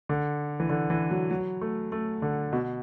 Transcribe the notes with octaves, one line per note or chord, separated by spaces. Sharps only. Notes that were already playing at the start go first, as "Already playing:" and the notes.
D3
E3
D3
E3
F#3
F#3
A3
A3
D3
B2